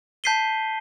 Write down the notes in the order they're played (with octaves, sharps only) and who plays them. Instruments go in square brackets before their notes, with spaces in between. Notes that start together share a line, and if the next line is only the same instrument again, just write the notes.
[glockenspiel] A5 G6 B6 C7 D#7 G7